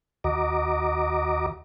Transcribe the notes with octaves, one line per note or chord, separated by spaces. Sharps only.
D#2 F#4 D#5 A#5 D6